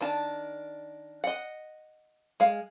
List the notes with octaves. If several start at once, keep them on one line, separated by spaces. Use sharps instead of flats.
D#3 D4 A5
D#5 F#5
G#3 F5